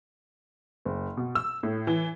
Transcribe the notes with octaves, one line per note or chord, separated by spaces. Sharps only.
F#1
B2
E6
A2
E3